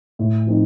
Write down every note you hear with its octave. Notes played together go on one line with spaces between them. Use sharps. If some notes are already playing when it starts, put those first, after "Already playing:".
A2
F3 C4 D#4